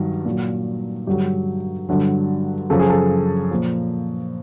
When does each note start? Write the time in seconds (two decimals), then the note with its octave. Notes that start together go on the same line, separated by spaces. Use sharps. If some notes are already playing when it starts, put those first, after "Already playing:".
Already playing: G2 D#3 F#3
0.25 A#2
0.30 F#3
1.07 G2 D3 F#3 G4
1.89 G2 D3 F#3
2.70 F#2 C#3 F3 A4
2.79 G#4
2.90 A4
3.51 A#2 F3